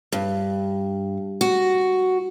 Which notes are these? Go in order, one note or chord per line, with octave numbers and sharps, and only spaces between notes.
G2
F#4